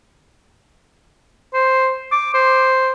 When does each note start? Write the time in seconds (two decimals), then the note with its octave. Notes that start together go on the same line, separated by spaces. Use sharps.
1.54 C5
2.12 D6
2.34 C5